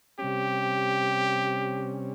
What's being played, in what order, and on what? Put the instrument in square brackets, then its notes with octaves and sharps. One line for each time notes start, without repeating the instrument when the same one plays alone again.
[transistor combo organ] C3 G3 C#4 [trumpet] G4